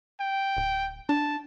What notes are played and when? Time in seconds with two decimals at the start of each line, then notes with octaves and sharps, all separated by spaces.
0.20 G5
0.57 D1
1.09 D4 A5